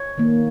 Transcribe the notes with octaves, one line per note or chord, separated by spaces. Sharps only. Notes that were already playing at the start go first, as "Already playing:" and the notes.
Already playing: C#5
D#3 A#3